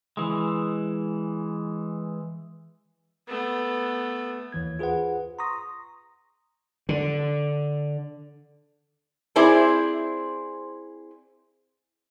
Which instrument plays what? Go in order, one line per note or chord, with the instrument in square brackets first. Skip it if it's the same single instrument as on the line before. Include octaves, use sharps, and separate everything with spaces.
[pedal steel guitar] E3 G#3
[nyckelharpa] A3 B3
[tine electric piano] D#2 E3 G#6
F4 G#4 B4 C5 F#5
A#5 C6 C#6 D#6 A#6
[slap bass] D3
[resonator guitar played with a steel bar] C4 E4 G#4 C5 D5